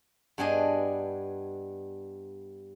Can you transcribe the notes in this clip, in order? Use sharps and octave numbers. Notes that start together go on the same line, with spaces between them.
G2 B3 D4 G#4 D#5